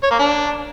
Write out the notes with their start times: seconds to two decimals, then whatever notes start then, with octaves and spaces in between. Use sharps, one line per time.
0.03 C#5
0.11 A#3
0.19 D4